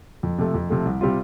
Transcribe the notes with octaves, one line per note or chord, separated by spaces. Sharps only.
F2
C3 F3 A3
F2
C3 F3 A3
C2
C3 G3 C4 F4